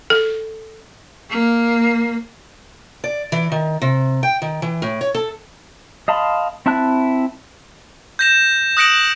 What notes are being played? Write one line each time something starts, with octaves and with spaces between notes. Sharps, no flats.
A4
A#3
D5
E3
D#3
C3
G5
D#3
E3
A2
C#5
A4
D#5 F5 A5 B5 C6
C4 E4 E5 A5 F#6
G6 A#6 E7
D#6 F#6 A#6 C#7 D7 F#7